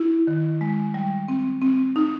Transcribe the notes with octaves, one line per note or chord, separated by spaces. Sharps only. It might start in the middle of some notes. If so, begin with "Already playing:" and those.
Already playing: E4
D#3
G#3
G3
C4
C4
D#4